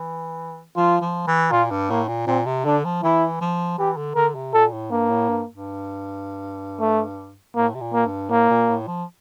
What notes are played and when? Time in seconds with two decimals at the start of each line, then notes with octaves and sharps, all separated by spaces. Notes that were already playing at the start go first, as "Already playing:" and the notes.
Already playing: E3
0.76 F3 F4
1.01 F3
1.27 E3
1.51 A#2 F4
1.71 G2
1.90 A2 A#3
2.08 A#2
2.27 A#2 C4
2.46 C3
2.65 D3 D4
2.85 F3
3.03 E3 E4
3.41 F3
3.78 E3 G4
3.97 D3
4.15 D3 A#4
4.35 C3
4.54 A#2 A4
4.72 A2
4.91 G2 A#3
5.10 A2
5.30 G2
5.54 G2
6.80 A3
7.55 A2 A#3
7.74 C3
7.81 A#2
7.93 A#3
8.06 G2
8.30 A2 A#3
8.50 A#2
8.69 A2
8.87 F3